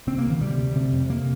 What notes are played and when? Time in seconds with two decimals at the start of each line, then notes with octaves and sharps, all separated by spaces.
0.07 C3 C4
0.18 A#3
0.25 D2
0.30 D#3
0.41 C3 G3
0.58 D2
0.75 C3
0.92 F2
1.09 C3 A#3